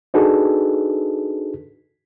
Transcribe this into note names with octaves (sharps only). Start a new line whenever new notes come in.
D4 D#4 F#4 G#4 A4 B4